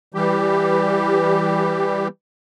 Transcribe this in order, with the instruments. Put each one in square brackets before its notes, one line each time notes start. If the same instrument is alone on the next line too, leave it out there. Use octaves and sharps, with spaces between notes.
[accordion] E3 G3 G4